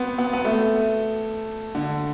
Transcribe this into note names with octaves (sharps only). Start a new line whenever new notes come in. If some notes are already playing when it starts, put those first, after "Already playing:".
Already playing: B3 C4
B3
B3
A3
D3